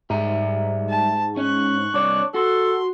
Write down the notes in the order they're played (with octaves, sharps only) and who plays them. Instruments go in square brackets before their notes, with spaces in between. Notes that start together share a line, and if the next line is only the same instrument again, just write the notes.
[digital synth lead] G#2 [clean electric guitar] G3 E5 A#5
[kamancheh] A5
[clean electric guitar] C#4 [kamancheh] C#6 F#6
[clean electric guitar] C2 C#5 [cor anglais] D4
[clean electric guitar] F#4 [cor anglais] A4 [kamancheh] C6